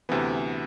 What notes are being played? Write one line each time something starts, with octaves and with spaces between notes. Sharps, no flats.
D2 C3 E3 B3